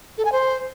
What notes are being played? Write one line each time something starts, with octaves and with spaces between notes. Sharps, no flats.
A4
G#5
C5